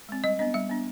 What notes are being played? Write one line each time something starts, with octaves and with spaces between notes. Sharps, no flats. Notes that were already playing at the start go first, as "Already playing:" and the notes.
G#3 C4
G3 D#5
B3 D4 D#5
G3 E5
B3 D4